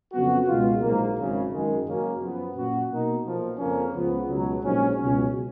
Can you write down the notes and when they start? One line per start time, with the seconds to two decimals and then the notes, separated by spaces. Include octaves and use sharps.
0.12 F2 C#3 F#3 B3 F#4
0.47 C#2 B2 G#3 B3 F4
0.81 A#1 G#2 F#3 A#3
1.16 G#1 F#2 C#3 G#3
1.50 F#2 D#3 G#3
1.85 F#2 C#3 F#3 A#3 C#4
2.19 F#2 F3 B3
2.54 A#2 F#3 C#4 F#4
2.88 B2 A#3 D#4
3.23 B1 A#2 F3
3.58 F2 C#3 F3 A#3 C#4
3.92 C#2 C#3 F3 B3 F4
4.27 C#2 B2 F#3
4.61 A#1 G#2 F#3 C#4
4.95 C#2 B2 F#3 C#4